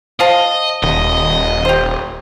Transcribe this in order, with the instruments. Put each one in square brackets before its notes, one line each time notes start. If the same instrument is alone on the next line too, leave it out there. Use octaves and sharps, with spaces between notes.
[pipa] F4 C5 A5 [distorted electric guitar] D#5
[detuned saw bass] D#1 [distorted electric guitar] D#5
[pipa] G4 C5